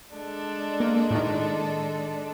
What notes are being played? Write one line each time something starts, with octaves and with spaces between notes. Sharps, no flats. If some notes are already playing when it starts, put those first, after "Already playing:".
G#3 D4 A4
A#3
A2 D#3